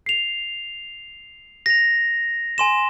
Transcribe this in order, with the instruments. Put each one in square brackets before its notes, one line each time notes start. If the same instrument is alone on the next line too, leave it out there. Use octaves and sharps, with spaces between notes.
[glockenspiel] C7 F7
A#6 F7
G#5 C6 E7